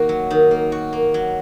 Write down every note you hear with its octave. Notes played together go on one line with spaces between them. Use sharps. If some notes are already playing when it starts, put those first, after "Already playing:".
Already playing: D#3 A#3 F#4
F#3
D#3
A#3
F#4
A#3
F#3